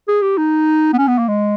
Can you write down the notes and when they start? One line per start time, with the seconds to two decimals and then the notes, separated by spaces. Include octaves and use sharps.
0.08 G#4
0.22 G4
0.38 D#4
0.93 B3
0.98 C#4
1.08 B3
1.18 A#3
1.28 G#3